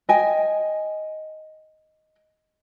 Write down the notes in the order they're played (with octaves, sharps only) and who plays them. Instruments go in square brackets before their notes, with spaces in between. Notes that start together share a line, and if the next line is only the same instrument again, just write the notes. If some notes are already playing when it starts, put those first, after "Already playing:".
[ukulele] D#5 G5 G#5